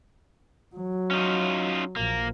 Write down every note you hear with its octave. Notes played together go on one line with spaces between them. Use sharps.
F#3
C#4 D#4 F4
A#1 A#3